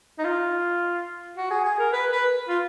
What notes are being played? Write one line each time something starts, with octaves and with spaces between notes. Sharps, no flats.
D#4
F4
F#4
G#4
G#4
A#4
B4
B4
F4